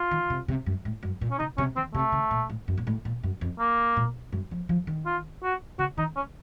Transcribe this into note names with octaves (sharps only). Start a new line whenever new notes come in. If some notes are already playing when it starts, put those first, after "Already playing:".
Already playing: F4
D#3
C3
C3
F#2
A2
F#2
A#2
C#4
C#3 D#4
C3 C#4
D#3 C4
C3 A3
C#3
A#2
A2
F#2
A#2
A2
A#2
F#2
F2
A#3
A#2
F#2
F3
F3
D#3
F4
F#4
C#3 F#4
D#3 D#4
C#4